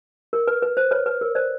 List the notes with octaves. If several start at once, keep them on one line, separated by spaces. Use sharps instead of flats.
A#4
B4
B4
C5
B4 C#5
B4
A#4
C5 D5